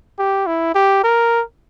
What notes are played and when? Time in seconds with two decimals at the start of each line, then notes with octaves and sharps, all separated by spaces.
0.19 G4
0.46 E4
0.75 G4
1.04 A#4